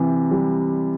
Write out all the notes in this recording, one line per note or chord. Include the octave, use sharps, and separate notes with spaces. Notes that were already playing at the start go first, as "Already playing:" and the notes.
Already playing: C3 E3
G3